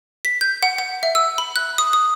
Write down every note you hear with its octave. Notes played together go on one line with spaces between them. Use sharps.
B6
G6
F#5
F#5
E5
E6
B5
F#6
D#6
D#6